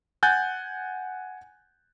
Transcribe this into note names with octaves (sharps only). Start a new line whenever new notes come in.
F#5 G#5 F#6 G6 A6